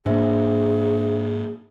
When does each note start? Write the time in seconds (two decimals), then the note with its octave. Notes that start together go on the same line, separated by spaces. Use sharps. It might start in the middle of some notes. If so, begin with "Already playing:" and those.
0.06 G#2 A#3 D4 G#4 C5 E5